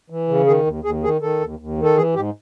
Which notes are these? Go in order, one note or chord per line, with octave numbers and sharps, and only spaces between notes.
E3
C#3
D#3 G#4
D#2
D#2 G#4
D#3 G#4
D#3 A4
D#2
D#2
D#3
A4
E3 G#4
G#2 G4